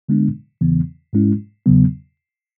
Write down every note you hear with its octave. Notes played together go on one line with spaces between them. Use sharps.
D3 G#3 B3 D4
E2 C#3 E3 B3
G#2 G#3 C#4 E4
E2 C#3 F#3 B3